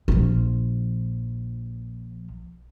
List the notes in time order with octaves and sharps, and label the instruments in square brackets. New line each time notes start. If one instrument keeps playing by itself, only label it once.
[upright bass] A#1 F3